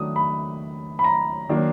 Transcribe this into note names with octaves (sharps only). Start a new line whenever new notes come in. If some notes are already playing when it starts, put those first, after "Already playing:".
Already playing: D#3 F#3 A3 D4 D#6
B5
B5
A#5
D#3 F#3 A#3 D4